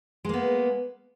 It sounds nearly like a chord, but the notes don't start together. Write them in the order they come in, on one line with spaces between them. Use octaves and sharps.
G#3 A#3 B3